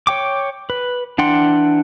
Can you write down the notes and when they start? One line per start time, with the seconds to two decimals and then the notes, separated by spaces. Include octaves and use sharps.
0.07 C#5 G5 D6
0.70 B4
1.18 E3 D4 F#5 G5 C6